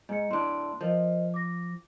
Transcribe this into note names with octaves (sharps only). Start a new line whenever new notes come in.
G#2 D#5 C#7
A2 D4 C6
F3 A#4 C5 D#5
D6 A#6